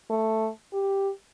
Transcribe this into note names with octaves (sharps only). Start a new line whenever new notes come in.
A3
G4